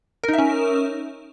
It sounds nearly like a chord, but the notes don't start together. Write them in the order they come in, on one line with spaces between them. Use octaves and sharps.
A#4 D#4 E5 C#4